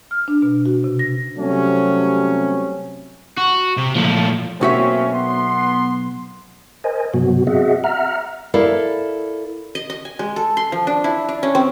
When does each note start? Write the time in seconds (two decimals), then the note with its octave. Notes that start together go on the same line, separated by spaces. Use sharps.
0.11 F6
0.28 D4
0.42 B2
0.66 F#4
0.84 C3
0.99 A#6
1.37 C3 F#3 G3 A3 C4 C#4
3.37 F#4
3.77 C3
3.96 A#2 F3 A3
4.61 B1 A#3 C4 C#4 F#4 E5
5.12 B3 C6
6.84 A#4 C5 D#5 G#5
7.14 G2 C3 F#3 B3 F#4
7.47 C4 F#4 G#4 D#5 E5 F#5
7.84 E5 F#5 A#5 F6
8.54 E4 A4 A#4 D5 F5
9.75 D#5
9.90 D#5
10.05 G#5
10.19 G#3
10.36 A4
10.57 C6
10.72 F3
10.87 D4
11.04 E4
11.29 D4
11.43 C#4
11.55 C4